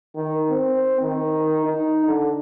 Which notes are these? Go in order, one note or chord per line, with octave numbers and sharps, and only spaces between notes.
D#3
C4
D#3
D#4
D3